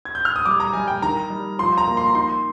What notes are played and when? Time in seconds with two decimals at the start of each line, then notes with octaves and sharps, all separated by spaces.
0.05 G#6
0.15 G6
0.25 F6
0.36 D#6
0.45 G3 D6
0.60 A#5
0.73 G3 G#5
0.88 G5
1.02 D#3 A#5
1.30 G3
1.59 F3 C6
1.78 A#5
1.87 A#3
1.97 C6
2.07 A#5
2.15 D#4 C6